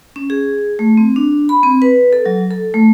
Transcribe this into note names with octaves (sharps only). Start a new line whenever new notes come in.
C#4
G#4
A3
C4
D4
B5
C4
B4
A4
F#3
A4
A3